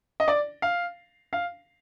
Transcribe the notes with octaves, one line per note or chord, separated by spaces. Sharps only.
D#5
D5
F5
F5